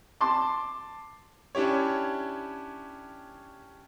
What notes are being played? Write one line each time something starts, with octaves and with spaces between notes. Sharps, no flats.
A5 C6 D6
C#4 D4 E4 G4 C#5